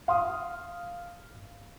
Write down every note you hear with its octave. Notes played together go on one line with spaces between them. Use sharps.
F5 C6 D#6